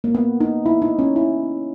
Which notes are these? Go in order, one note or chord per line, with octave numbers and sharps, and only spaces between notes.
A#3
B3
D#4
E4
D#4
C#4
E4